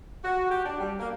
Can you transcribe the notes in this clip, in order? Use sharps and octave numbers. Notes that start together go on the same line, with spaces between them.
F#4
G4
D4
G3
A#3